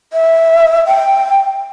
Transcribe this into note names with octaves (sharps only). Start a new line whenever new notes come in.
E5
G5